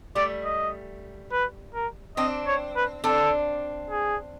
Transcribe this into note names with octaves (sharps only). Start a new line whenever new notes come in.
G3 A3 D5
D#5
B4
A#4
C4 D4 D#5
C#5
B4
C4 D4 A4
G#4